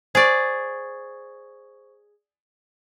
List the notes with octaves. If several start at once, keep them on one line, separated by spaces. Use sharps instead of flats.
G#4 C5 D5 C#6